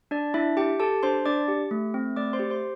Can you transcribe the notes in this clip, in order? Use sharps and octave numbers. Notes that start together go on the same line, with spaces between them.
D4 D5
D4 E4 E5
G4 G5
G4 A4 A5
D4 C5 C6
D4 D5 D6
G4
A3
C4
A3 D5 D6
C5 C6
G4
C5 C6